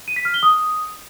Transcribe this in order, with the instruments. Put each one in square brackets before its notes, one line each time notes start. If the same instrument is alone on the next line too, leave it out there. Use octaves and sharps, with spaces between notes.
[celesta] D#7
B6
F6
G7
D#6